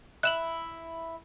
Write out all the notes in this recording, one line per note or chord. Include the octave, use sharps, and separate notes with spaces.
E4 F#6 E7 F#7